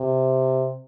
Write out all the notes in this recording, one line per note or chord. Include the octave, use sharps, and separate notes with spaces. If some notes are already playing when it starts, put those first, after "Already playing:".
Already playing: C3